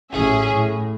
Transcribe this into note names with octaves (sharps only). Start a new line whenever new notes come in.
A1 C#4 G#4 E5
A2